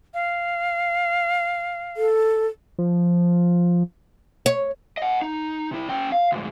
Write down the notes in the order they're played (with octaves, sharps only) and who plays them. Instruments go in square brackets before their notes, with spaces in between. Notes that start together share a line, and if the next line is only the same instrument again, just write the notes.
[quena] F5
[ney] A4
[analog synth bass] F3
[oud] C#5
[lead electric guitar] D#5 F#5
D#4
C3 E4
C#4 G5
F5
D2 G#2